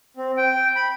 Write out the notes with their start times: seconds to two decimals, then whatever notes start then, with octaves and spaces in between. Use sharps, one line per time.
0.17 C4
0.37 G5
0.76 B5